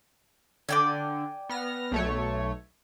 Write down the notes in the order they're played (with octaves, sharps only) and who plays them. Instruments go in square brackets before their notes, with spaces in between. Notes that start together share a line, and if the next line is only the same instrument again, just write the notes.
[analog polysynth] D3 [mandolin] D5 G5 G#5
[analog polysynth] B3 F6 A#6
B1 A3 C#5